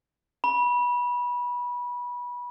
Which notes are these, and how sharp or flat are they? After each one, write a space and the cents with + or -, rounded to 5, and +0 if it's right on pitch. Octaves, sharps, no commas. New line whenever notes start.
B5 -20